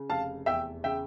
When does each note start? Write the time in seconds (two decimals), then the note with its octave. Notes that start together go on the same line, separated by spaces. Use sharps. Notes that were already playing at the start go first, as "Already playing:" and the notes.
Already playing: C#3
0.10 F1 F5 A5
0.46 E2 E5 G5
0.84 C#3 E5 G5